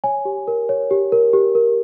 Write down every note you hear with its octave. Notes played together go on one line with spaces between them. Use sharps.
C#5 G#5
G4
A#4
C#5
G4
A#4
G4
A#4